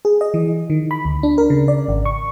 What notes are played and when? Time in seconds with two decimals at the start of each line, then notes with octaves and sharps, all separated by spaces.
0.05 G#4
0.21 D#5
0.34 E3
0.70 D#3
0.91 B5
1.05 D2
1.23 D4
1.38 A#4
1.50 C#3
1.68 D5
1.88 G#1
2.05 C#6